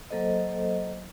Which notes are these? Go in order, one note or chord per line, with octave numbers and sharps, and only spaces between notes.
F#3 A#3 A4 C5 D#5